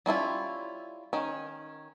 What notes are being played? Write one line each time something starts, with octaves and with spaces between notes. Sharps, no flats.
G3 C#4 E4 F4
D#3 C#4